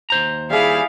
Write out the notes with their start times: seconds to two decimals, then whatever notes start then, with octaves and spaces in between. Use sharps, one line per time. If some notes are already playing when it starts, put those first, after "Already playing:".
0.10 D#2 C5 A#5
0.50 G3 E4 G#4 F5